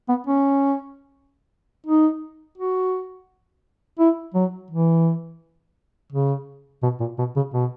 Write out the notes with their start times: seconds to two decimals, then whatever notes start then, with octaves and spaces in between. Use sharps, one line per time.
0.09 B3
0.27 C#4
1.86 D#4
2.58 F#4
3.99 E4
4.34 F#3
4.70 E3
6.12 C#3
6.83 B2
7.00 A#2
7.18 B2
7.36 C#3
7.54 B2